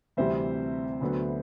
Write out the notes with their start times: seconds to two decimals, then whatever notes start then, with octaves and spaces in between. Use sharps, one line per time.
0.17 D2 C3 E3 G3 C4 C5 E5
1.01 D2 D3 F#3 B3